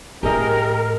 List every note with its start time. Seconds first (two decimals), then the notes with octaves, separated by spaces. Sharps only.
0.23 A2 G4 G#4 A#4 D#5